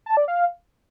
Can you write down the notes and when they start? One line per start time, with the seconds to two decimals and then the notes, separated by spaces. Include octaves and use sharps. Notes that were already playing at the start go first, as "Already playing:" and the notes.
0.06 A5
0.17 D5
0.28 F5